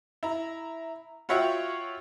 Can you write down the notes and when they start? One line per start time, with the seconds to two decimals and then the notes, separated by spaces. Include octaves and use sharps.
0.23 E4 A#5
1.29 F4 F#4 C#5 E5 F#5 G5